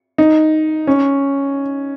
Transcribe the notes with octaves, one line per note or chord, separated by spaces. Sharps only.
D#4
C#4